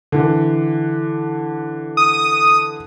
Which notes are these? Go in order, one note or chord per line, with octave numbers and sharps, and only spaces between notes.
D3 E3
D#6